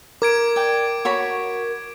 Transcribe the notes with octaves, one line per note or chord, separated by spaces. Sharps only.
A#4 D6 G#6 D7
D5 G5
F#4 C#5 B5